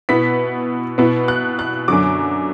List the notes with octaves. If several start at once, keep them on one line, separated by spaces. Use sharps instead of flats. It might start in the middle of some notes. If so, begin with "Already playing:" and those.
B2 B3 E4 B6
B2 B3 E4
F#6
F#6
F#2 D3 F#3 D6